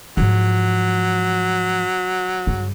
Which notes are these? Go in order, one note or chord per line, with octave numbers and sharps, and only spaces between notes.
G#2 F3 F#3
G2 C#3